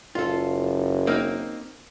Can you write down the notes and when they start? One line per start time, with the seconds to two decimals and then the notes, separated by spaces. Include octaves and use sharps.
0.15 F#1 F4 A4
1.07 A#3 C4 D#4